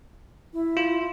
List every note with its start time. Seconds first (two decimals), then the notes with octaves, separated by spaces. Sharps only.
0.53 E4
0.77 F4